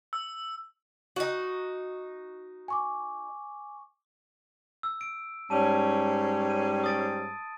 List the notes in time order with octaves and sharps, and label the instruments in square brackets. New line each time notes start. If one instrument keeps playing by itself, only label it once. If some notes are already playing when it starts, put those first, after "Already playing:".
[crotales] E6
[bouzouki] D#4 F#4
[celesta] G#5 C#6 D6
[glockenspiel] E6
D7
[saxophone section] G#2 G3 C#4 [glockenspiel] A5 D#7
[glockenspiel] D#7
D#6 A6 D7